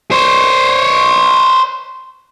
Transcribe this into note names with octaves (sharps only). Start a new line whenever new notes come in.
C5 C#5